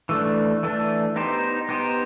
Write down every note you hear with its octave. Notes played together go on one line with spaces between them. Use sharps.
E3 A3 D4
E3 A3 D4
B3 D#4 G4 C5
B3 D#4 G4 C5